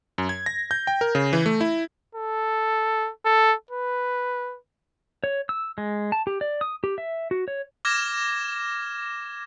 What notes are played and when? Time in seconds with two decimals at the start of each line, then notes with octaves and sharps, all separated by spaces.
0.18 F#2
0.29 G#6
0.46 A#6
0.71 G6
0.87 G5
1.01 A#4
1.15 C#3
1.33 E3
1.46 A3
1.61 E4
2.15 A4
3.26 A4
3.71 B4
5.24 C#5
5.49 E6
5.78 G#3
6.12 A5
6.27 G4
6.41 D5
6.61 D#6
6.84 G4
6.98 E5
7.31 F#4
7.48 C#5
7.85 D6 F6 G#6 A#6 E7